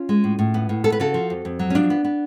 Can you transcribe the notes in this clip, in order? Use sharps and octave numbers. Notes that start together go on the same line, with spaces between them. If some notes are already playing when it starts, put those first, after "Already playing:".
Already playing: C#4 F4
G#3
A2
A2
B3
A2
B3 A4
B4
C#3 F#4 A4
F3
F2
F2
F#3
C#4
F3 D4
B3
B3